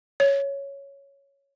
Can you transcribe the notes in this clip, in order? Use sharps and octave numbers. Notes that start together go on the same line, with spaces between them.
C#5